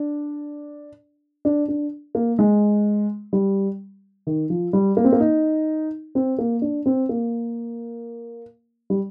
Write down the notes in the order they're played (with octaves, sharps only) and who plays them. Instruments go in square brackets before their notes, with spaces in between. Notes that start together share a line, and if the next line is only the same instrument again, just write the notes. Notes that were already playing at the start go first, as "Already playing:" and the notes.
Already playing: [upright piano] D4
D4
D4
A#3
G#3
G3
D#3
F3
G3
A#3
C4
A#3
D#4
C4
A#3
D4
C4
A#3
G3